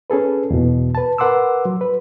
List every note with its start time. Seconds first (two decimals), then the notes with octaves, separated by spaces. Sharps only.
0.10 C#4 G#4 A4 B4
0.51 E2 B2
0.95 B4 A5
1.18 A#4 B4 F#5 C6 D6 E6
1.65 F#3
1.81 B4